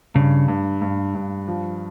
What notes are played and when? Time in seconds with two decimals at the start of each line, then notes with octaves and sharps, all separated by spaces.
0.15 G2 C#3
0.48 G2
0.82 G2
1.15 G2
1.48 F3